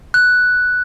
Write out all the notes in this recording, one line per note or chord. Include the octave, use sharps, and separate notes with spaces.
F#6